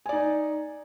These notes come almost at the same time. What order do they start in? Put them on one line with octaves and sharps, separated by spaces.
G#5 D5 D#4